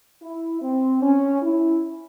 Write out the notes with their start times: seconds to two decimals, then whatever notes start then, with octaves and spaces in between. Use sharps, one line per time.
0.21 E4
0.62 C4
1.02 C#4
1.42 E4